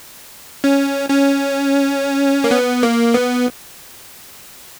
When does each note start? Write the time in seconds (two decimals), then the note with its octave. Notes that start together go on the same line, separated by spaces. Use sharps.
0.64 C#4
1.10 C#4
2.44 A#3
2.51 B3
2.83 A#3
3.14 B3